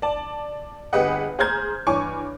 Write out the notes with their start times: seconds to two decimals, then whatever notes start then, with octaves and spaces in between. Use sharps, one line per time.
0.02 D5 A5
0.93 G1 G4 G#4 B4 D#5 F#5
1.39 G#4 C5 A#5 F6 G6 G#6
1.87 G2 E3 C#5 G#5 C#6 D6